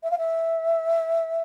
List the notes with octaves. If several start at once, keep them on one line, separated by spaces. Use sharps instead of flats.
E5
F5
E5